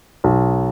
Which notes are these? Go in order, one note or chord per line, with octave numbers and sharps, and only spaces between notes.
B1